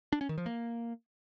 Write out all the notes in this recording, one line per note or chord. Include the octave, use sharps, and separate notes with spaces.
D4
C#4
D#3
F3
A#3